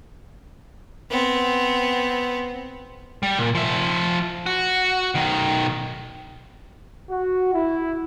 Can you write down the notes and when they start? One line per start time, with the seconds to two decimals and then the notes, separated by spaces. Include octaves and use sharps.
1.10 B3 C4
3.23 G3
3.39 A#2
3.55 F3 E5
4.46 F#4
5.15 B1 D#3
7.11 F#4
7.54 E4